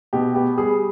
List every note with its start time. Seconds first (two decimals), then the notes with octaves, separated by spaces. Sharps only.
0.13 B2 G4
0.35 B3 G4
0.57 G3 G#4